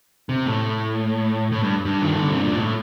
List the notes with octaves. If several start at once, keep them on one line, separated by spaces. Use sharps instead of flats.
C3
A2
A2
G2
G2
D#3
D3
C3
A#2
A2